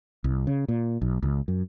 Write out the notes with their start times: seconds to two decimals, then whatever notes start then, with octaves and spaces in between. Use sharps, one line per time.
0.24 C2
0.47 C#3
0.68 A#2
1.02 B1
1.23 C#2
1.48 F#2